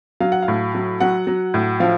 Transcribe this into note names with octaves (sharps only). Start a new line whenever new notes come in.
F#3 F5
F#5
F5
A2
F#3
F#3 F#5
F#3
A2
F3 F5